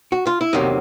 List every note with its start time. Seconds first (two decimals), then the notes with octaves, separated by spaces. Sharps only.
0.12 F#4
0.27 F4
0.41 E4
0.53 E2 C3 D#3 F#3 A#3 D#4